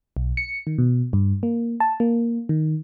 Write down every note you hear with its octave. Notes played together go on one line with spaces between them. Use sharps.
B1
C#7
D#3
B2
G2
A#3
A5
A#3
D#3